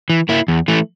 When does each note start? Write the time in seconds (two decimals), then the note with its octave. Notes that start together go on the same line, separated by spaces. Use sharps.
0.10 E3
0.29 A#3 E4
0.48 E2
0.68 E3 A3